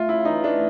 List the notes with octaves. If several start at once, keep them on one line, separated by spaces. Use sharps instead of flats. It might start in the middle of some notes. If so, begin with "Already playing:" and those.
Already playing: A3 F4
C#3 E4
E3 D#4
A3 D4